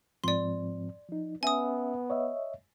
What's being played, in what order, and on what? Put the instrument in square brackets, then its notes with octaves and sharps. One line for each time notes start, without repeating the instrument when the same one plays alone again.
[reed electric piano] G#2 F3 C4 [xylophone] D5 C6
[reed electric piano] F3 D#4
[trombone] B3 [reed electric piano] C#4 E5 [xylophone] G#5 D#6
[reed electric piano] C#5 D#5 E5